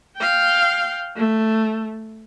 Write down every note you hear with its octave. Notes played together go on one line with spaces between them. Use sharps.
F5 G5
A3